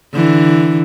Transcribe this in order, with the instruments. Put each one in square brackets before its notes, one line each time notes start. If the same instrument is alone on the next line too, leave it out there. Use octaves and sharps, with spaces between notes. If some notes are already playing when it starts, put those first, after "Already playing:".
[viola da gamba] D3 E3